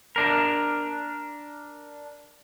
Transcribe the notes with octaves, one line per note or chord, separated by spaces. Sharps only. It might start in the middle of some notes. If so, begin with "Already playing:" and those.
D4 A#4